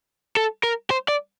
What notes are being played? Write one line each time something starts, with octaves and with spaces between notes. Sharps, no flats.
A4
A#4
C5
D5